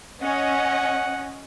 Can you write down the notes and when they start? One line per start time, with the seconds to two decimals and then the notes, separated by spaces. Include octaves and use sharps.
0.23 C#4 D#5 F#5